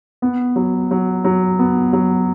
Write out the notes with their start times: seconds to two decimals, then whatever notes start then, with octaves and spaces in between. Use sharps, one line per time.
0.22 B3
0.56 F#3
0.91 F#3
1.24 F#3
1.59 B3
1.93 F#3